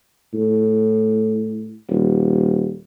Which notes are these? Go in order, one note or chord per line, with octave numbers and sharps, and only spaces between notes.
A2
D#1